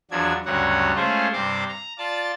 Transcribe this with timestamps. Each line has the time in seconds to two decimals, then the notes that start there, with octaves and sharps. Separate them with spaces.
0.11 E2 F3 F#3 D4 G#6
0.46 D2 G2 C#3 F#3 C#5 F#5
0.95 G#3 A3 C#4 F4 G#4 C5
1.33 G2 C3 C4 C6 D6
1.69 A#5
1.98 F4 D5 A5 A6